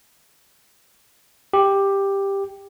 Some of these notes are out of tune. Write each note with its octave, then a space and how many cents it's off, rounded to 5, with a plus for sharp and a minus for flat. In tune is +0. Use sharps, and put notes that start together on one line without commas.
G4 +10